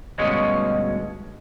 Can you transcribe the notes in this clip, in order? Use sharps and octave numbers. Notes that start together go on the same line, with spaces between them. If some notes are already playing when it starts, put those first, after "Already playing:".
D2 G2 B2 G#3 C#4